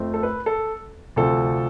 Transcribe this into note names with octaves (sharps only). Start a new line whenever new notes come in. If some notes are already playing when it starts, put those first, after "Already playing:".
Already playing: F2 A3 C4
A4
B4
A4
D2 C3 F3 C4 A4